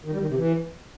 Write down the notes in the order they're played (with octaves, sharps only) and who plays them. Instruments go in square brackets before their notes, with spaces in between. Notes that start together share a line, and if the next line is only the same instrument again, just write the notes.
[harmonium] D#3
G3
D#3
C3
E3